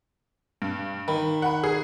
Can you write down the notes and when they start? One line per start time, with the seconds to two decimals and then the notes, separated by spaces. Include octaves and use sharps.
0.62 G2
1.08 D#3 B5
1.42 F#5 B5
1.64 G#4